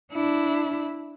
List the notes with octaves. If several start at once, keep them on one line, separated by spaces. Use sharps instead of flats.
D4 E4